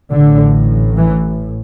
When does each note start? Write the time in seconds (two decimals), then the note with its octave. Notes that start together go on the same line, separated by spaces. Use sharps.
0.11 A1 A2 D3
0.97 E3